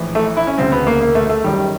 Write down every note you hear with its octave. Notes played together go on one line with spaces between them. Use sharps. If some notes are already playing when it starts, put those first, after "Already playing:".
Already playing: A#1 A2 E3
A3
E4
C#4
E1 D2 C#3 C4
B3
A#3
A#3
A3
A3
G#1 F#2 D#3 G3